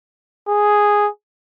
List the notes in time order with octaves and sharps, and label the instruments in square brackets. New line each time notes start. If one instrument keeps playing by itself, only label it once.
[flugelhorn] G#4